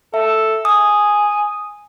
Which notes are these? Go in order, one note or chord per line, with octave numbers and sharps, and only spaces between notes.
A4 E5
G#5 D#6